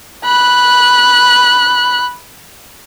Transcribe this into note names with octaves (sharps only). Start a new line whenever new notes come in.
B5 F#6